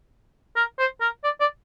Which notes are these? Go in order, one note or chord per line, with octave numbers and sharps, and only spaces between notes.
A#4
C5
A#4
D5
D5